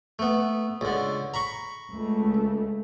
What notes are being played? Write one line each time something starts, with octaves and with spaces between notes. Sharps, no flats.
A3 B3
C#2 D3
A#5 B5 C#6
C#2 A3